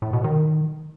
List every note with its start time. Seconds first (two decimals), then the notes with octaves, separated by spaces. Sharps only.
0.02 A2
0.13 B2
0.24 D#3